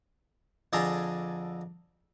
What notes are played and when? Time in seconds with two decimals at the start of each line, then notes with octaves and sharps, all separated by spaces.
0.73 F2 D3 G#4 A4 G#5 A#5